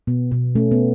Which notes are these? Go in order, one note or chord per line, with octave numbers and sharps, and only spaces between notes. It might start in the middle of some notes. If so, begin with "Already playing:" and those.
B2 B3
B2 B3
A3 C#4
B3